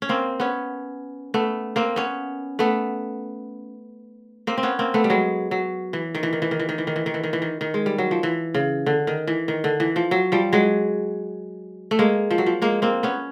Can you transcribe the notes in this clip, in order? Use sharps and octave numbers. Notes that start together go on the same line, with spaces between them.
C#4
A#3 C4
B3 C#4
A3 B3
A#3 C4
B3 C#4
A3 B3
A#3 C4
C4
B3 C#4
A#3 C4
A3 B3
G3
F#3 G#3
F#3
E3
D#3
E3
D#3
E3
D#3
E3
D#3
E3
D#3
E3
D#3
E3
D#3
E3
D#3
D#3
G#3
G3
F#3
F3
E3
C#3
D3
D#3
E3
D#3
D3
E3
F3
F#3
F3 G3
F#3 G#3
A3
G#3 A#3
F3
F#3
F3
G#3 A#3
A#3 C4
B3 C#4